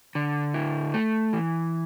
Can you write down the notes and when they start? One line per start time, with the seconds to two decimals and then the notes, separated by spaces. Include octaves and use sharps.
0.15 D3
0.54 E4
0.94 A3
1.33 E3